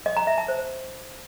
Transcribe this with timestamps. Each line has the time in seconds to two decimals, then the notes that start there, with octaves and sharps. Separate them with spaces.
0.06 D#5
0.17 A#5
0.27 E5
0.38 A5
0.48 C5